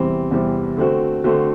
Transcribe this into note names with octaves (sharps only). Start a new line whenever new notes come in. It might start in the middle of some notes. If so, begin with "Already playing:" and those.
Already playing: E2 C3 E3 G3 C4
E2 C3 E3 G3 C4
D3 A3 C4 F#4
D3 A3 C4 F#4